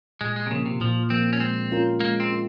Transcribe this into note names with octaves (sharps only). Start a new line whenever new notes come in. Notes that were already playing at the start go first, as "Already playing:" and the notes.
A#2 G#3
G#3
C3
C#3 F3 A#3
C3
A#2 F3
F3 A#3 C4
C#4
G#3 C4
C#4 F4 A#4
G#3 A#3
C4
C#4 F4 A#4